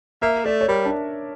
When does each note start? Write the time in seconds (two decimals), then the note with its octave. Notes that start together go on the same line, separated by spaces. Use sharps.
0.22 A#3 E5
0.45 A3 D5
0.61 C#5
0.68 G3 A#4
0.85 D4